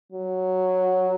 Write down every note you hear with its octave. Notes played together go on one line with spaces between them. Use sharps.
F#3